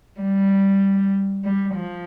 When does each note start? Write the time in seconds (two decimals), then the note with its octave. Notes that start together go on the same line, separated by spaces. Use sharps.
0.21 G3
1.45 G3
1.75 F3